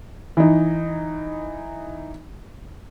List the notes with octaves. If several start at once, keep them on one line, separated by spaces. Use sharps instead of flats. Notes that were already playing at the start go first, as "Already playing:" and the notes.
E3 D#4